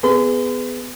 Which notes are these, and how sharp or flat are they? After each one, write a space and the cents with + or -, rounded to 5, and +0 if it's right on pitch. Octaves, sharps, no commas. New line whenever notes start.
B3 +15 G#4 +0 C6 -40